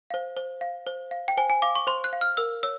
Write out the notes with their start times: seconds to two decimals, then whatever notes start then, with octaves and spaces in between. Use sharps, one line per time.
0.10 C5 F5
0.37 C5
0.61 F5
0.87 C5
1.11 F5
1.28 G5
1.37 C5 G#5
1.50 G#5
1.62 F5 D6
1.75 C#6
1.87 C5 C6
2.04 F#6
2.13 F5
2.21 F6
2.37 A#4 E6
2.63 C#5 E6